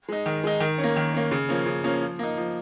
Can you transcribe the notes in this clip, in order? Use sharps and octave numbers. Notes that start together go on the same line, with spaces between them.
G#3 D#4
D#3
G#3 D#4
D#3
C#4
A#3
D#3
A#3 C#4
C#3
F3 A#3 C#4
C#3
F3 A#3 C#4
F3
A#3 D#4
F3